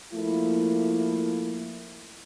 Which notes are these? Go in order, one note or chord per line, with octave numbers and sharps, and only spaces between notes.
F3 A3 A#3 E4